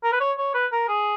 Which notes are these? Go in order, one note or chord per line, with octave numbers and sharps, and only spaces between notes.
A#4
B4
C#5
C#5
B4
A#4
G#4